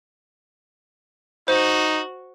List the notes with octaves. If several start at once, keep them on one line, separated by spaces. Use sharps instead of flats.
D#4 F#4 C5